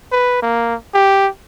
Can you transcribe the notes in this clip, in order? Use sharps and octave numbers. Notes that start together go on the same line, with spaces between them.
B4
A#3
G4